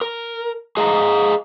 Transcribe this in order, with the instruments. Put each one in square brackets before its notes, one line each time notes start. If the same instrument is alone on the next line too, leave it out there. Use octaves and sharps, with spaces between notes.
[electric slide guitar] A#4
G#4 D#5 F5 G#5 A#5